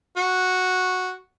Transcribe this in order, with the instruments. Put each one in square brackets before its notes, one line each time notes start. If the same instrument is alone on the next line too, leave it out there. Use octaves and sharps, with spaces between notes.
[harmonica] F#4